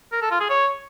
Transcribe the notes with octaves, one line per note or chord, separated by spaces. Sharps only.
A#4
A4
F4
G#4
C#5